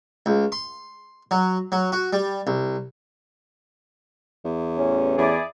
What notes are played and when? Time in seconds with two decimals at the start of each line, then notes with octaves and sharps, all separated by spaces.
0.26 C#2
0.52 C6
1.31 F#3
1.72 F#3
1.92 F#4
2.13 G3
2.47 C2
4.44 E2
4.78 A1 C#4
5.17 E2 E4 G#4 D5